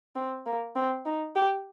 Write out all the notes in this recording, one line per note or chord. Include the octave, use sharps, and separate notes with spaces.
C4
A#3
C4
D#4
G4